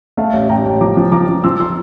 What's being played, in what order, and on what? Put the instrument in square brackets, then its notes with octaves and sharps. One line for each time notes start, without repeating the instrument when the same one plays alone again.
[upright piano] A3 [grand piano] F5 A5
[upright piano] A1
[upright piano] A1 [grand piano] G5 A#5
[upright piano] A1
[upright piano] F3 [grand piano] A#5 D6
[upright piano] F3
[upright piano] F3 [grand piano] A#5 D6
[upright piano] F3
[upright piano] F3 [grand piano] C6 E6
[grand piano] C6 E6